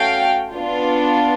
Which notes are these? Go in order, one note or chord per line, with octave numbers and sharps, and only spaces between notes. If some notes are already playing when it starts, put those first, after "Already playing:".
Already playing: A3 C#4 F#4 A4 F5 G5
B3 D4 F4